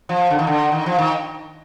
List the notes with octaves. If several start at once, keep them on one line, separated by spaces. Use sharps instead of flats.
F3
D3
D#3
D3
D#3
F3
D#3